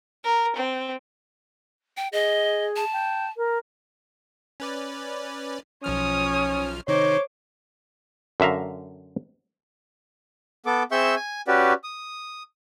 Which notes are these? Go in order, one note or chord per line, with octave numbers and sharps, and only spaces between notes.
A#4
C4
G5
G#4 D#5
A5
G5
A#4
C#4 B4 D5
B1 F3 C#4 C#5 D#6 F6
C3 D#3 D#4 C5 C#5 D6
F#2 D3 E5 F5 A#5
B3 A4 D6
C4 G#4 E5 C#6 E6 G6
G#5
C#4 F#4 G4 B4 D5
D#6